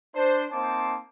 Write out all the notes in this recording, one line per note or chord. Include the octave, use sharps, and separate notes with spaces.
D4 C5
A#3 C4 D#4 C5 A5 D6